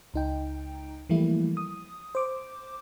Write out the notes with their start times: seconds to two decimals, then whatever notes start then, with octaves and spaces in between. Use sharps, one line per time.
0.14 C#2 D#4 G5
1.09 E3 F3 G3 A3 A#3 E4
1.57 D#6
2.15 C5 D6